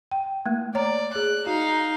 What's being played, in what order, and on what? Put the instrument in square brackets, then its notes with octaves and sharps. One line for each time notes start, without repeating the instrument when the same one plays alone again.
[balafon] G5
A3 A#3
[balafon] C#5 A#5 [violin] D5
[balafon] G#4 C#5 [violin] F#6
[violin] D#4 F5 [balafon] F#4